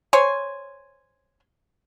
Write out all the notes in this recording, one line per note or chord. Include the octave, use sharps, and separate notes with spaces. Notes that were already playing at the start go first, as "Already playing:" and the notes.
C5 C#5 G#5